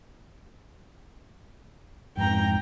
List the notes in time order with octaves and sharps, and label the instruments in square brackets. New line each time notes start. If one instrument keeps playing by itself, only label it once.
[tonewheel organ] F2 G#2 [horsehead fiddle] G5 A#5